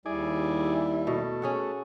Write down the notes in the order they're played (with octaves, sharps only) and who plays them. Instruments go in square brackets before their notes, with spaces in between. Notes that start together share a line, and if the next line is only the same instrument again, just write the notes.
[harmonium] D#2 G3 [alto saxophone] E4 [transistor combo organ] G#4 D5
[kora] B2 [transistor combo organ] A3
[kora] C#4 G#4 F#5